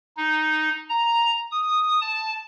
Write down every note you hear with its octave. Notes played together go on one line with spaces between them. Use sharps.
D#4
A#5
D#6
A5